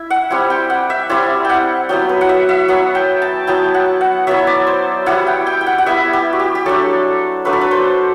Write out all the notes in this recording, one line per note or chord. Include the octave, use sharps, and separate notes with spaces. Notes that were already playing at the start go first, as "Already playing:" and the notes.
Already playing: E4 E5
F#5
G3 C4 E4
G5
F#5
E5
G3 C4 E4 D5
F#5 G5
F#3 B3 E4 G5
B4
F#5
E5
E5
F#3 B3 E4 F#5
G5
A5
F#3 B3 E4 G5
F#5
F#5
F#3 B3 E4 E5
D5
C5
G3 B3 E4 F#5
G5
G5
G5
F#5
F#5
G3 B3 E4 E5
G4
F#4
G4
G4
F#3 A3 D4 A4
F#3 A3 D4 B4
A4
B4
C5